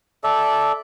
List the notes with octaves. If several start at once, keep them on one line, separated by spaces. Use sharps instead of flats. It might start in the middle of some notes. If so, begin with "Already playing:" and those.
A4 D5 E5